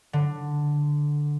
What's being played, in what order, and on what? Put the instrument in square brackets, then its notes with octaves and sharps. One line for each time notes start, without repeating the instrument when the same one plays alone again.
[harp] D3